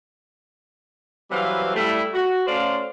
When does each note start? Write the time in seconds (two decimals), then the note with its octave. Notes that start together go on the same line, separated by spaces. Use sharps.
1.31 E3 F#3 G3 C4 B4 F5
1.75 G3 A3 E4
2.14 F#4
2.47 A3 C#4 C5 D5 F5